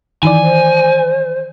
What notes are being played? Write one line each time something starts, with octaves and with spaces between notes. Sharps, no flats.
D#3 E3 D5 G#5
C5